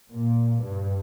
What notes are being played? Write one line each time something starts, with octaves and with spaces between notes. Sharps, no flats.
A#2
G2